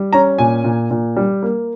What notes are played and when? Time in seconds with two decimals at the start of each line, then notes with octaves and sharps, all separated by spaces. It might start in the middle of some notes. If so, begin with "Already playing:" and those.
Already playing: G3
0.13 C#4 A#5
0.38 A#2 G#5
0.64 A#2
0.91 A#2
1.16 G3
1.43 A#3